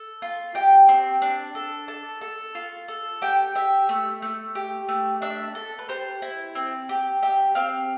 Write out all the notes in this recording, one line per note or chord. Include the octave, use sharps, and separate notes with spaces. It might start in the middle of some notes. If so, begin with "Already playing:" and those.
Already playing: A4
F4
G4 G5
C4
D4
A4
A4 A5
A4
F4
A4
G4 G5
G4 E5
A3
A3
G4
A3
D4 E5
A4
B4
G4 C5
E4
C4
G4
G4 E5
C4 F5